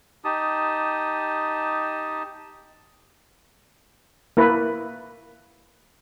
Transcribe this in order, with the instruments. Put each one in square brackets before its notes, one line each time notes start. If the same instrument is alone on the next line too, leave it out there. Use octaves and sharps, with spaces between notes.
[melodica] D#4 G4 A5 D#6
[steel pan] A#3 E4 B4